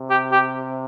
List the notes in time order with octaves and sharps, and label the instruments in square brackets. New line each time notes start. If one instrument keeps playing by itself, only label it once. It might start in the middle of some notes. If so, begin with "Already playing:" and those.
Already playing: [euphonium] C3
[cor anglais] G4
G4